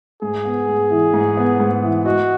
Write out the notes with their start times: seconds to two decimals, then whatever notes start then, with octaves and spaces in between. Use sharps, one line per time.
0.22 G#2 G#4
0.45 B3
0.68 G#2
0.91 E3
1.14 G#2
1.37 B3
1.60 G#2
1.83 E3
2.05 F#4 D#5